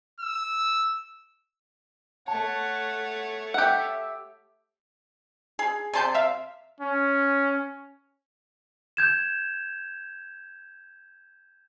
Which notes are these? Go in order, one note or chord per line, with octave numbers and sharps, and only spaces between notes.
E6
A3 C#5 F#5 A5
G4 E5 F#5
G#4
C3 D5 G#5 A5 C6 G6
E5 F5
C#4
G6 G#6 E7